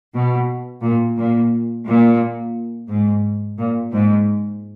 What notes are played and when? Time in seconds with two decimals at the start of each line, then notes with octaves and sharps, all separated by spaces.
0.15 B2
0.82 A#2
1.17 A#2
1.85 A#2
2.88 G#2
3.58 A#2
3.91 G#2